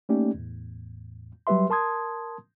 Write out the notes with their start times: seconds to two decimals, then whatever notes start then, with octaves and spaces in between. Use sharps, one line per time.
0.09 A3 A#3 C#4 D#4 G4 D5
0.34 E2 A2
1.47 F#3 G3 G4 B4 E5 C6
1.70 A#4 A5 C6 D#6 G#6